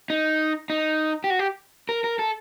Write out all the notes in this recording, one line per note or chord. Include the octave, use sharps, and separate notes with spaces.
D#4
D#4
G4
F#4
G4
A#4
A#4
A4